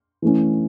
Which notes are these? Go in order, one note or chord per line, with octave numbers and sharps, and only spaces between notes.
E3 A3 C#4